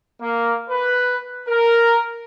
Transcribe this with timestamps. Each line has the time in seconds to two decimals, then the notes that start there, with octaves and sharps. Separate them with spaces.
0.21 A#3
0.70 B4
1.48 A#4